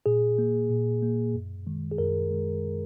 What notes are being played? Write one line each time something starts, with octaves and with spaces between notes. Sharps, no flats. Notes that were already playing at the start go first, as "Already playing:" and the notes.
A#2 G#4
A#3
A#2
A#3
F#2
D#3 G#3
G#4
F#2 A#4
D#3 G#3